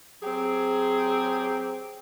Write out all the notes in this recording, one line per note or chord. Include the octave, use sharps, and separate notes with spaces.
F#3 C4 G4 G#4